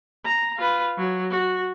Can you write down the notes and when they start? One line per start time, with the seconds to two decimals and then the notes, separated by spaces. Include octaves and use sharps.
0.25 A#5
0.58 F4 B4
0.98 F#3
1.30 F#4